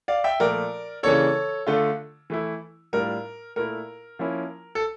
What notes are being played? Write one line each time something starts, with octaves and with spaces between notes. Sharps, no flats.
D5 F5
E5 G5
A#2 F3 A3 A#4 D5
C#3 E3 A#3 D4 A4 C#5
D3 A3 D4 F4
E3 A3 E4
A2 G3 D4 F4 A#4
A#2 A3 E4 A#4
F3 A#3 C#4 E4
A4